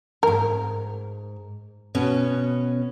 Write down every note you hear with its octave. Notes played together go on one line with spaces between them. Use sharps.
F2 G#2 A#4
B2 B3 C#4